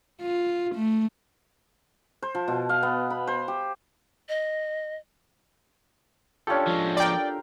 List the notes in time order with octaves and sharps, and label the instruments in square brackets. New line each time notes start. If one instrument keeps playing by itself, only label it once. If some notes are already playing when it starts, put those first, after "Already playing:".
[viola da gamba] F4
A3
[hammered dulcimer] C5
F3
B2
F5
B3
B5
C5
G4
[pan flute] D#5
[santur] C#4 G4 [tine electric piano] D4 F4 A4
[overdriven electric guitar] F3 G#3
[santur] A#4 C6 [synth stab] D5 G5